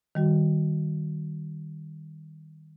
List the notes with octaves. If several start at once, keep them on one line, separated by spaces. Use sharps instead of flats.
D#3 G3 F#4